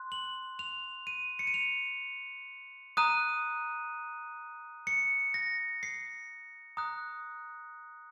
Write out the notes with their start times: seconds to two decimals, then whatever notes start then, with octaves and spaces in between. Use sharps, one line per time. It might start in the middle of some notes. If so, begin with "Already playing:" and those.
Already playing: C6 F#6
0.12 F#7
0.59 F7
1.07 D#7
1.39 C#7
1.47 D#7
1.54 F7
2.97 A#5 D#6 F#6 D#7
4.87 C#7
5.34 A#6
5.83 C7
6.77 A#5 D#6 F#6